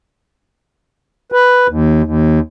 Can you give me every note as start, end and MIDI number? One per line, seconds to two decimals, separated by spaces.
1.32 1.67 71
1.68 2.03 39
2.03 2.39 39